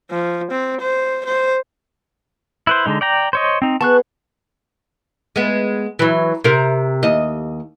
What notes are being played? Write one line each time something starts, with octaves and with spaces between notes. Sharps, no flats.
F3
C4
C5
C5
E4 B4 C5
D3 G#3 D#4
D5 G5 A#5
C5 C#5 D#5
C4 D#4
B3 G#4 A5 C#6 F#6
G#3 B3
E3 F#3
C3 A#4
D#2 D#5